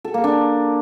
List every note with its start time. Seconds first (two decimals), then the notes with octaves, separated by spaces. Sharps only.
0.04 A4
0.14 A#3
0.24 D4